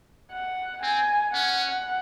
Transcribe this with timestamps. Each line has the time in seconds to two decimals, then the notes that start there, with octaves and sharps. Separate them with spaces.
0.32 F#5
0.83 C4 G#5
1.35 C#4 F#5